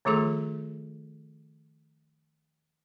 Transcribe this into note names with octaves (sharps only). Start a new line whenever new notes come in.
D#3 F3 A3 F4 G#4 A4